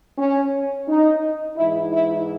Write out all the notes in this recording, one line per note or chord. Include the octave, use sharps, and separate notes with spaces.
C#4
D#4
G#2 E3 E4
E4